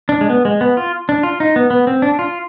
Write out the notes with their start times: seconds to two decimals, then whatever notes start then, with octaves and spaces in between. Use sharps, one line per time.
0.09 D4
0.21 G#3
0.30 B3
0.45 G#3
0.61 B3
0.77 F4
1.09 D4
1.23 F4
1.40 D#4
1.56 B3
1.70 B3
1.87 C4
2.02 D4
2.19 F4